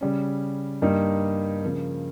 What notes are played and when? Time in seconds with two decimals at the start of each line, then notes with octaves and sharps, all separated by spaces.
0.01 C#3 G3 C#4
0.82 G2 G3 A#3 D#4
1.63 C#3 F3 A#3